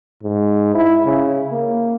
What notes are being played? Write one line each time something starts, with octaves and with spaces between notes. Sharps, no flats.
G#2
E4
C#3
A#3